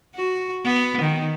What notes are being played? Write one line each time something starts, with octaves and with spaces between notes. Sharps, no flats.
F#4
B3
D#3